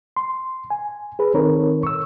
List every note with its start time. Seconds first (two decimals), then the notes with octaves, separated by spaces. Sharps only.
0.17 C6
0.70 G#5
1.19 G#4 B4
1.34 D#3 C4 D#4 A4 A#4 C#5
1.83 C#6 E6